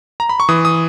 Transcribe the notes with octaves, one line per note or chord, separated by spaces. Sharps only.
A#5
B5
C#6
E3 D#6
D#6